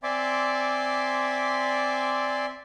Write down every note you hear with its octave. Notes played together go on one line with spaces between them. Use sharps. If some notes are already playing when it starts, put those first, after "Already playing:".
C4 D5 E5 G#5 C6 D6